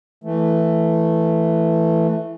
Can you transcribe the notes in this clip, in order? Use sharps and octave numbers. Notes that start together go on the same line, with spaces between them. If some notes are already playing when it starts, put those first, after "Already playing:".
E3 A3